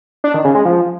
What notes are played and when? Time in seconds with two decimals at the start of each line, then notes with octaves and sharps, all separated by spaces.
0.24 D4
0.34 D#3
0.45 C#3
0.55 G#3
0.65 F3